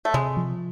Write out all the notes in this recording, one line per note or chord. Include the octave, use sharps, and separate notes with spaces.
A3
C3 G#3
F3